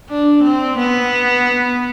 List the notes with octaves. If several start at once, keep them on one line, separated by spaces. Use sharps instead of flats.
D4
C4
B3